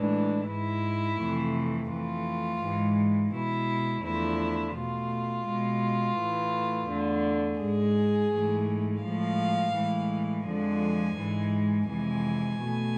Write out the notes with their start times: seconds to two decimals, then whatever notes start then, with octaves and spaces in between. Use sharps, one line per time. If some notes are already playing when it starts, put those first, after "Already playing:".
Already playing: A2 E3 G#3 D4
0.47 G#2 G#3 E4
1.18 F2 C3 E3 A3
1.89 F2 E3 A3 F4
2.60 G#2 E3 G#3
3.32 B2 G#3 E4
4.03 E2 D3 F3 A3 E4
4.75 B2 A3 F4
5.45 B2 G#3
6.17 A2 E3 A3
6.88 E2 D3 A3
7.59 G#2 G#3 G#4
8.31 G#2 E3 A3
9.02 A2 F3 G#3 F5
9.74 A2 E3 G#3
10.45 F2 D3 F3 G#3 G#5
11.17 G#2 E3 G#3
11.87 F2 C3 E3 G#3 G#5
12.59 B2 A3